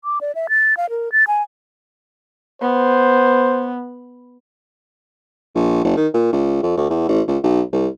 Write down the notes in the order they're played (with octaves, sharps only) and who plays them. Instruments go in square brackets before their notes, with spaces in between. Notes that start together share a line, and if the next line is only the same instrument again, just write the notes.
[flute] D6
D5
E5
A6
F5
A#4
A6
G#5
[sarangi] B3 [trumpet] C5
[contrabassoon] A#1
F#1
D#3
A#2
C#2
F2
D2
E2
A1
C#2
B1
C2